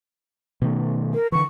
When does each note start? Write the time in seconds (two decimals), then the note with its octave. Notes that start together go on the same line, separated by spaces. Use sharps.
0.62 B2 D#3 A3
1.14 A#4
1.32 D3 E3 C#6